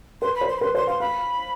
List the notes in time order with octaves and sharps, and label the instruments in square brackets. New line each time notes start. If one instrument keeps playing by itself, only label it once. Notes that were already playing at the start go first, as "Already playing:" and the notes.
[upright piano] B4 [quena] C6
[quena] B5
[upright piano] C5
[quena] C6
B5
[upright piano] B4 [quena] C6
[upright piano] C5 [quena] C6
[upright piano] F5 [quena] C6
[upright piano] F5 [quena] B5